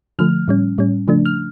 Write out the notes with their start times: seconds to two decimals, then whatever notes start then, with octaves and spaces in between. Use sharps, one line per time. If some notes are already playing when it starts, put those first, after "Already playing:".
0.19 D3 F3 A3 F6
0.48 A2 G3 C#4
0.78 A2 G3 C#4
1.08 C#3 F3 A3 D4
1.26 F6